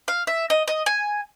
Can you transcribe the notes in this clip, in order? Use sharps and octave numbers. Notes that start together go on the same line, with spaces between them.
F5
E5
D#5
D#5
G#5